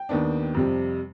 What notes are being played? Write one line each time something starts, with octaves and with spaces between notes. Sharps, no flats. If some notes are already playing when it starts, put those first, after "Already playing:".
Already playing: G5
D#2 D#3 B3 D4
F2 C3 G3